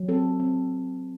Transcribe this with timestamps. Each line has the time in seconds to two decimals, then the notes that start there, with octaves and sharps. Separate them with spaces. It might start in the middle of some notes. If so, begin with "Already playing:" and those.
Already playing: F#3
0.08 C4 A4
0.40 C4